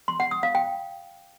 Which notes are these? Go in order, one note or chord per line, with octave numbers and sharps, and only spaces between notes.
C6
F#5
D#6
F5
G5